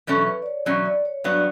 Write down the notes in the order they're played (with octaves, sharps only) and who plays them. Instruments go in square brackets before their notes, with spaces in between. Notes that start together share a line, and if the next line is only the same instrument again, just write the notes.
[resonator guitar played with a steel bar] E2 B2 F#3 C#4 [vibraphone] A4
[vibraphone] B4
D5
C#5
[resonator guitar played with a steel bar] E2 B2 F#3 C#4 [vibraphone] D5
[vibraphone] D5
C#5
[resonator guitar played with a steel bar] G2 F#3 B3 [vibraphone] D5